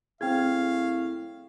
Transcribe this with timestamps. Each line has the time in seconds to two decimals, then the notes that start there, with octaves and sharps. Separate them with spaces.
0.21 A2 C4 G#4 F5 G5 G#6